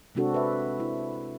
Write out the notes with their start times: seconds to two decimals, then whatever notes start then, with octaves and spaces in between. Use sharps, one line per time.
0.15 C3 G#3 C4 D4 F#4 A4
0.34 B4 E5
0.80 E4